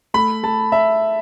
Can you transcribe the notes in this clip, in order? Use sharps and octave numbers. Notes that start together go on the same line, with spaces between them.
A3 B5
A3 A5
E5